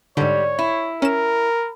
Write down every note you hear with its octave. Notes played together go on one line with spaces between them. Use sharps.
G#2 D3 G3 C#5
E4
C#4 A#4 E7